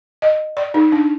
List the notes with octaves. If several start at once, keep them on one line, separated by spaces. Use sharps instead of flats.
D#5
D5
D#4
D4